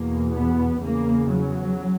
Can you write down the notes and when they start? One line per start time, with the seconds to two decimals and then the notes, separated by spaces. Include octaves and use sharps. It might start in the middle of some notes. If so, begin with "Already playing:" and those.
Already playing: E2 B2 A#3
0.33 B3
0.81 E2 C#3 A#3
1.30 F#3